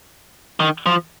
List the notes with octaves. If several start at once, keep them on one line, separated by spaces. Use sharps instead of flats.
D#3
F3